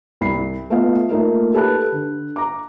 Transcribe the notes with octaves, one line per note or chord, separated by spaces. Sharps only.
C2 B5 C7
A3 B3 F4 D#5 F5
A3 A#3 D#4 F4 A#4
G4 A4 B4 A5 B5 F#6
D3
A#5 D6